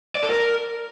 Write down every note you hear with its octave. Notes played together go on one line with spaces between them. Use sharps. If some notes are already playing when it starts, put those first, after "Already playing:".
D5
A4
A#4